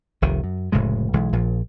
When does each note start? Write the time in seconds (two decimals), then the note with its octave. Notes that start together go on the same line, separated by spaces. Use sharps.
0.22 F1 C2 D#3
0.44 F#2
0.72 F1 A2 C#3 G#3
1.13 B1 E3 G#3
1.33 A#1 A#2 F3